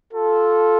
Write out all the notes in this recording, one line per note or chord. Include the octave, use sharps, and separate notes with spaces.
F4 A4